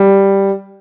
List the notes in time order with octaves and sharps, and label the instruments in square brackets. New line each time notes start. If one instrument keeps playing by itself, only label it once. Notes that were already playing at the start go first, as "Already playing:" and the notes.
Already playing: [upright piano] G3